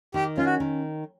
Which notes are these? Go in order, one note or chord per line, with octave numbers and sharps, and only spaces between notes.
D#3 G4
C#4 F4
F#4
D#3